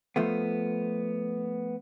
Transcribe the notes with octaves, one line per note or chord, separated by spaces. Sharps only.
F3 A3 B3